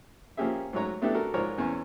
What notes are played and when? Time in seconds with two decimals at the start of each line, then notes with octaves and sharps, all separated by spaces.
0.37 F3 A#3 C#4 G4 G#4 E5
0.73 G#2 F#3 A3 C#5 A#5
1.01 A3 B3 D4 E4 G4 A4
1.15 F#4 A4 A#4
1.34 G#2 F3 A#4 C#5 D5
1.58 E2 C#4